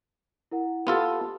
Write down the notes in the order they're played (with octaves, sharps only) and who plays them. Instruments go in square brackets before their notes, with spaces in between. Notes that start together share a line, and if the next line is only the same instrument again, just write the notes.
[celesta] E4 A#4 F#5
[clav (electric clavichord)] B3 F4 A4 [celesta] G4 A5